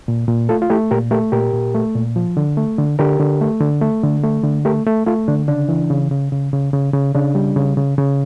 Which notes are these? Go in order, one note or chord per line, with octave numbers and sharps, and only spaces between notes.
A#2
A#2
A3 F4 A4
F4
A3 E4 G4
A#2 G4 A#4
A3 G4 A#4
A#2 G4 A#4
A#2
A3
A#2
F3
D3
A3
D3
D3 G4 A#4
D3
A3
D3
A3
D3
A3
D3
A3 G4 A#4
A3
A3 F4 A4
D3 D4
C#3 D4
E3
C#3
C#3
C#3
C#3
C#3
C#3
C#3 D4
G3
C#3
C#3
C#3